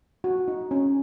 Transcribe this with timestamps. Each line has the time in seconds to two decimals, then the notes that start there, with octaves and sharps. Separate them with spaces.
0.24 F#4
0.48 D#4
0.71 C#4